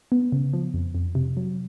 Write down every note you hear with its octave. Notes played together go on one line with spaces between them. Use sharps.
B3
C#3
F3
F2
F2
C3
F#3